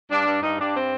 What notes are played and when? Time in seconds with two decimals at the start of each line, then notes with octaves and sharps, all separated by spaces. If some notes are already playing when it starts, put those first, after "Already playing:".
0.10 G2 D4
0.26 G2
0.42 G2 D#4
0.59 G2 D4
0.75 C4